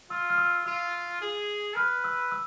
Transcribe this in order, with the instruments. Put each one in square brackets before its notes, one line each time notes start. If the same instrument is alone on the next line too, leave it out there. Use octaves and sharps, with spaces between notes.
[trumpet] F4 [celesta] E6
[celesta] F6
E6
[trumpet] F4 [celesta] E6
[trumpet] G#4
[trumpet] B4 [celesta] F6
[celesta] E6
E6